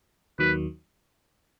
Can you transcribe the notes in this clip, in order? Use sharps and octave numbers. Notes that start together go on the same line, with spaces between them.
D#2 D#3 F#3 B4